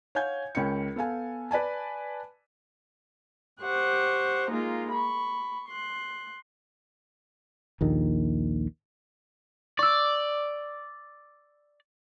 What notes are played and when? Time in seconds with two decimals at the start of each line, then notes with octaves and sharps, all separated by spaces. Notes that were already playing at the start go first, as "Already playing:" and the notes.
0.15 C#5 F5 F#5 G#5 G6 G#6
0.55 C#2 C#4 A#4 G5 C#7
0.96 B3 A4 F5 G#5
1.51 B4 D5 G#5 A5
3.62 G4 C5 F#5 C#6
4.50 G#3 A#3 D#4 F4
4.92 B5 C#6
5.69 C6 F#6
7.81 A#1 D#2 D#3
9.79 D5 C#6 E6